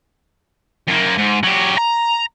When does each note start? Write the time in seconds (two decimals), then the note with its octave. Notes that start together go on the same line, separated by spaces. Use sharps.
0.88 F#2 A#3
1.18 G#2
1.43 F#3 G4
1.78 A#5